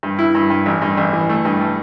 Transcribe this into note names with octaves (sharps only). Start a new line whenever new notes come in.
G2
E4
G2
G2
A1
G2
A1
E3
A3
G2
A3